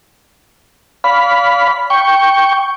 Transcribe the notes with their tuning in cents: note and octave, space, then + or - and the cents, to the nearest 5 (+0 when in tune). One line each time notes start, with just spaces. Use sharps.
D5 -40 F5 +0 B5 +0
G5 +0 C#6 +0